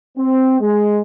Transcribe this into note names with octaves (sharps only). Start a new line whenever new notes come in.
C4
G#3